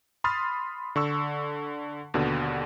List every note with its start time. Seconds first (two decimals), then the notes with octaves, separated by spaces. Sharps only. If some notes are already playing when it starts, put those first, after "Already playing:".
0.24 B5 C6 D#6 F6 A6
0.96 D3 C#6 E6
2.14 D#2 B2 D3